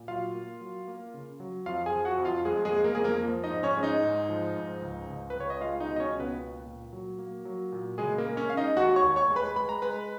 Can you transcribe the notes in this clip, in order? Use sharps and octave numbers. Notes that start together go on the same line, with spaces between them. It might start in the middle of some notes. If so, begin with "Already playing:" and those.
Already playing: A#2
F#3 F4 F5
A#3
F#3
A#3
C#3
F#3
F2 F4 F5
G#4 G#5
F3
F#4 F#5
F2
F4 F5
F2 G#3 G#4
G#3 G#4
A#3
A#3 A#4
F2 G#4
A#3 A#4
F3
D#4 D#5
G#2
C#4 C#5
G#3
D#4 D#5
G#2
F3
G#2
C#2
C#2
B4
C#2
C#5
D#5
G#3 F4 F5
D#4 D#5
B2
D#5
C#4 C#5
C#2
B3 B4
A#3
A#2
F#3
A#3
F#3
A#2
C#3 G#3 G#4
A#3 A#4
G#3
C#4 C#5
G#3 F5
D#4 D#5
D#2 F#4 F#5
C#5 C#6
D#2
C#5 C#6
G#3
B4 B5
G#3 B5
A#5
G#3 B4 B5